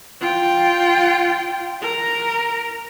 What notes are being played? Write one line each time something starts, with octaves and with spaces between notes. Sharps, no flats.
F4 G5
A#4 A#5